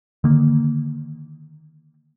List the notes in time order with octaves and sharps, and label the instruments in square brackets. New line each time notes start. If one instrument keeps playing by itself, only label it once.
[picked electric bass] D3 D#3 A#3